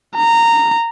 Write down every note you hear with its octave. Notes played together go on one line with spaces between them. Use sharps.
A#5